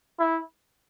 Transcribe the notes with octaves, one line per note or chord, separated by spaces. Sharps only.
E4